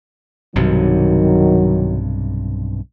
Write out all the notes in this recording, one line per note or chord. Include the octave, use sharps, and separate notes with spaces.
B1 G2 C3 D#3 F#3